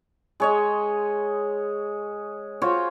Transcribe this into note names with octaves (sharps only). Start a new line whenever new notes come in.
G#3 C#5 D#5
F4 F#4 C5 C#5